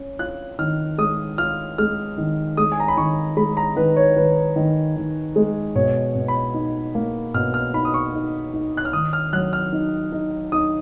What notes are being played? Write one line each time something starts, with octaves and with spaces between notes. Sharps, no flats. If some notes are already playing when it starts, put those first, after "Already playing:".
Already playing: C#4
F4 F#6
D#3 F6
G#3 D#6
F4 F6
G#3 F6
D#3
G#3 D#6
G#5
A#5
B5
D#3 C#6
G#3 B5
A#5
D#3 B4
C#5
D#3 B4
D#3
D#3
G#3
B2 C#5
B2
B5
D#4
A#3
B2 F6
F6
D#4 B5
D#6
C#6
D#4
D#4
F#6
F6
D#3 D#6
F6
F#3 F#6
F6
D#4
D#4
D#4 D#6